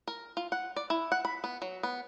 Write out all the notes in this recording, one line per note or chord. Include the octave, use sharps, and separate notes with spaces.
A#4
F4
F#5
D5
E4
F#5
B5
B3
F#3
B3